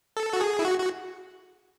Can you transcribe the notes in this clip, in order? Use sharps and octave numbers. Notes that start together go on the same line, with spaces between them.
A4
F#4
G#4
E4
F#4
F#4